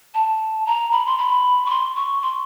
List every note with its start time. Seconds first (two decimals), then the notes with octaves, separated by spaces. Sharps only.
0.14 A5
0.66 A#5
0.92 B5
1.06 C6
1.18 B5
1.66 C#6
1.70 C6
1.96 C#6
2.22 C6